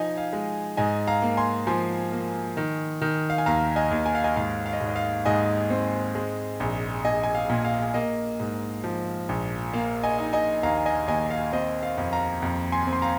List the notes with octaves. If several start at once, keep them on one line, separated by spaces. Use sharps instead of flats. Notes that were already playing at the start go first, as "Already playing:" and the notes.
Already playing: F3 D#4 D#5 G#5
F5
G#3
G#2 D#5 G#5
F5 A#5
A#3
G#5 C6
F3 G#5 C6
A#3
D#3
D#3
F5
G#5
D#2 F5 A#5
D#5 G#5
D#2
G#5
F5
D#5 G#5
G#2 F5
F5
D#5
G#2
D#5
F5
G#2 D#5 G#5
C4
G#3
A#1
A#1 D#5 G#5
G#5
F5
A#2
F5
A#3 D#5
G#2
F3
A#1
A#3 F5
D#5 G#5
D#4
D#5 G#5
D#2 F5 A#5
D#5 G#5
D#2 D#5 G#5
F5
C4 D#5
F5
F2
F5 A#5
F2
G#5 C6
C4
C6
F5 A#5